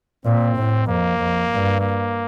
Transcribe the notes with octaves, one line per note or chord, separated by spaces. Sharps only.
A#2 C4
A2
F2 A#3
F2
G2
A#3